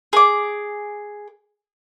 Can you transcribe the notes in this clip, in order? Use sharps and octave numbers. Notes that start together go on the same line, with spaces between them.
G#4 D6